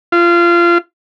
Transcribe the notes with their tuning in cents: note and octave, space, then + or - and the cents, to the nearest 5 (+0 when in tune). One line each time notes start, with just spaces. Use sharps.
F4 -25